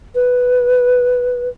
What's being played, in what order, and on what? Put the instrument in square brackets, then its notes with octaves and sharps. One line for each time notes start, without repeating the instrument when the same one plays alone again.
[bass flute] B4